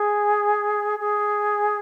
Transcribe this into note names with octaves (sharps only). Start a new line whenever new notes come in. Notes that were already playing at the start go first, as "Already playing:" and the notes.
Already playing: G#4
G#4